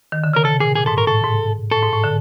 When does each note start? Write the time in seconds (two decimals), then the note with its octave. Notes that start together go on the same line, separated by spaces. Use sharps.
0.12 D#3
0.24 D3
0.34 C#3 A#4
0.44 C3 A4
0.60 A#2 G#4
0.75 A#2 G#4
0.86 G#2 A4
0.97 A2 A#4
1.07 A2 A4
1.24 G#2
1.71 A2 A4
1.83 G#2
1.93 A2
2.04 D3